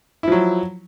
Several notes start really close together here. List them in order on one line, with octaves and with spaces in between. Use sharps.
E4 F3 F#3